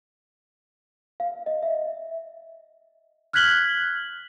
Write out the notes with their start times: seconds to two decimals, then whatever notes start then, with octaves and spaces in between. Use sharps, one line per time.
1.20 F5
1.46 D#5
1.63 E5
3.33 F6 F#6 G#6 B6 F#7 G7